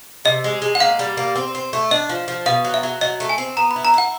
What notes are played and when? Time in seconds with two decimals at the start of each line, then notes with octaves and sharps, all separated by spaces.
0.25 C3 D#5
0.44 G#3
0.62 G#3
0.75 F#5
0.80 A#3 F5
0.99 G3
1.17 A#3
1.36 C4
1.55 C4
1.73 A3
1.91 D4 D#5
2.09 F3
2.28 F3
2.46 B2 F5
2.65 F#3
2.74 E5
2.83 F#3
3.01 F#3 D#5
3.20 A3
3.29 G#5
3.38 C4
3.57 B3 A#5
3.71 B5
3.76 E4
3.85 A#5
3.94 E4 F#5